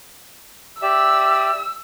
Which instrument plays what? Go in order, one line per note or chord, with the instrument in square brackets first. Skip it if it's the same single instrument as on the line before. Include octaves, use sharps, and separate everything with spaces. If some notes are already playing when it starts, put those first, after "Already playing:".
[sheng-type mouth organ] G4 D5 E5 [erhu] E6